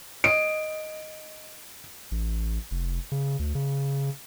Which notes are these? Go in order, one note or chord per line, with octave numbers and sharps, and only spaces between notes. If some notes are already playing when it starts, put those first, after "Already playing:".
D#5 D7
A1
F1
C#3
D2
C#3